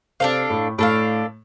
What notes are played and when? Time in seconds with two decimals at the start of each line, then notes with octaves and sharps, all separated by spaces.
0.20 C3 C4 D4 A4 F5
0.49 A2 A3
0.78 A2 A3 D4 A4 F5